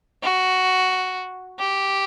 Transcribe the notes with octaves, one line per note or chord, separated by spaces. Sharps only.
F#4
G4